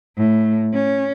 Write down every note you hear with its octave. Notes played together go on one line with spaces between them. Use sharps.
A2
C#4